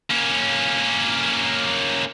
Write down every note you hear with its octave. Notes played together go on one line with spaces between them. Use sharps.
A#3 C#4